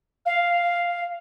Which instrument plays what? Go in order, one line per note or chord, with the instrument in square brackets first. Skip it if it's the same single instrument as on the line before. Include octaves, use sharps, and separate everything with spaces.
[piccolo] F5